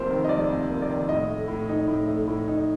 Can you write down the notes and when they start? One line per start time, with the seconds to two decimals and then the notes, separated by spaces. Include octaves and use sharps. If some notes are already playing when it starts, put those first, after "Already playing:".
Already playing: F1 F2 A#3 C5
0.10 D#3
0.24 D#5
0.29 F1 D5
0.49 F2
0.70 A#3
0.82 D5
0.90 D#3
1.08 A2 D#5
1.28 A3
1.48 A2
1.69 D#4
1.88 A2
2.08 A3
2.28 A2
2.48 D#4